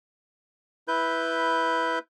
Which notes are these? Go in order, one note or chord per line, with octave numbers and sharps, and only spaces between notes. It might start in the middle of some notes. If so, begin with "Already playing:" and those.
E4 B4 G6